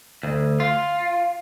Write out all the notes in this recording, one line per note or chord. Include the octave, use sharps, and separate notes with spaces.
D2
F4